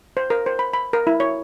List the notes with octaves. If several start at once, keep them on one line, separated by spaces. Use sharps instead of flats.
C5
A#4
C5
B5
B5
A#4
E4
C#5